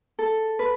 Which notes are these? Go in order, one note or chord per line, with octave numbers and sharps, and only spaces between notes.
A4
B4